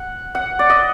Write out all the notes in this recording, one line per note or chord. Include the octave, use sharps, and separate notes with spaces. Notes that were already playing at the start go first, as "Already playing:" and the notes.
Already playing: F#5
F#5
D5
D#5